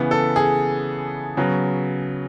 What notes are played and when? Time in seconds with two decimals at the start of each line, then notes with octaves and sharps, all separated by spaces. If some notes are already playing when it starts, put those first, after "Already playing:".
Already playing: C#3 E3 B3
0.11 A4
0.36 G#4
1.37 C#3 F#3 B3